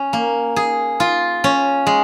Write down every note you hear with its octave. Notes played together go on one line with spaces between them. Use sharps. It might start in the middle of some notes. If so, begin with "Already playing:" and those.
Already playing: C#4
A#3
G#4
F4
C#4
G#3